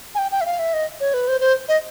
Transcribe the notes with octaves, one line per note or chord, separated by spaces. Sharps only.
G#5
G5
G5
E5
F5
E5
D#5
C#5
B4
C5
C5
D#5